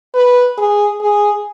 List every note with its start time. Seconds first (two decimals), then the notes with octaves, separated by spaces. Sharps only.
0.15 B4
0.58 G#4
1.01 G#4